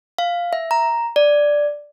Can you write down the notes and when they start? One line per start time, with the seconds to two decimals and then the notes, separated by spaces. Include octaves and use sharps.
0.18 F5
0.53 E5
0.71 A#5
1.16 D5